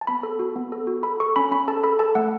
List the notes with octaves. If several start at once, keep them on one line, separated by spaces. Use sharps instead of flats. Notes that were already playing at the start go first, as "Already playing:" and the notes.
A5
B3 B5
A4
F#4
B3
A4
F#4
A4 B5
A4 C#6
C#4 B5
C#4 B5
A4 A5
A4 B5
A4 A5
A3 F#5